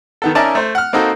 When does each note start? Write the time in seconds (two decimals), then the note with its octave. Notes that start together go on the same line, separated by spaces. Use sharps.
0.22 D#3 B3 A4
0.35 C#4 D#4 A#4 D5 E5 A5
0.55 A3 C5
0.75 F#5 F6
0.93 A#3 C4 D#4 F#4 A4